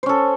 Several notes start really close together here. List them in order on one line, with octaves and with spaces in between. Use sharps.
C5 C#4 A4